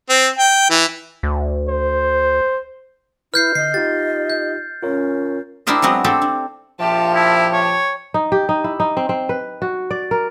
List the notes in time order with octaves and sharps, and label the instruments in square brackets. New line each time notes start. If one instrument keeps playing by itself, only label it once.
[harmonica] C4
G5
E3
[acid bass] D2
[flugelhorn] C5
[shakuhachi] E4 [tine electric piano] B4 [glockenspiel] F6 G6 C7
[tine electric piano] D3 [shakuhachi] D#5 [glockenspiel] C7
[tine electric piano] D#4 F4 G4 [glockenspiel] A6
[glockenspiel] G6
[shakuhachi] C#4 [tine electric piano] F4 A#4 C#5
[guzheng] D4 E4 G4 A#4 C5 D#5
F#3 G#3 B3 C4 F#4
C4 G4 A4 C5
D4
[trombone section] A#1 F3 [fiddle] G4 A5 [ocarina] E5
[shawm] E4
C#5
[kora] D#4
G4
D#4
E4
D#4
C4
C4
B4
F#4
D5
A#4